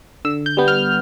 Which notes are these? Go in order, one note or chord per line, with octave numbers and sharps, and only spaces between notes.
D3 E6
G6
G3 B3
F6